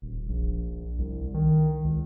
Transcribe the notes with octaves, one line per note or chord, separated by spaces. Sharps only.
D#1
A#1
C2
D#3
C#2